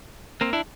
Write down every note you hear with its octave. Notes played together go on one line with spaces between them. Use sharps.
A#3 C4
D4 E4